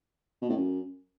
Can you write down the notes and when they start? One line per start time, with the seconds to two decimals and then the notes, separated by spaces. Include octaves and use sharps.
0.42 B2
0.49 A2
0.57 F#2